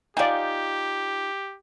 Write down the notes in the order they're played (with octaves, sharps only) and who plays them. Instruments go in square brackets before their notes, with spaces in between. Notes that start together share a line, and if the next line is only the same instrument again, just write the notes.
[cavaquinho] D#4 F4 [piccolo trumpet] G4 [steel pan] D5 G5 G#5